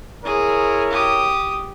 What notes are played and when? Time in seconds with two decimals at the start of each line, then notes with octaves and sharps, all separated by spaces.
0.25 E4 G#4 A#4 C#5
0.91 G4 D#6